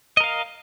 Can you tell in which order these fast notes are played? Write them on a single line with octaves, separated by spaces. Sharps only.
D#5 A#4 F5